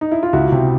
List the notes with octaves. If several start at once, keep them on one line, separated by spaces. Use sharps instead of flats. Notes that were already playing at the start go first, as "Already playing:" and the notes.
D#4
E4
F4
C#2 E4 F#4
C3